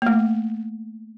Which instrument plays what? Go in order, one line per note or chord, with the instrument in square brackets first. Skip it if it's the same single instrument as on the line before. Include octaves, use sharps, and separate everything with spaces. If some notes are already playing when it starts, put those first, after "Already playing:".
[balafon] A3 A#3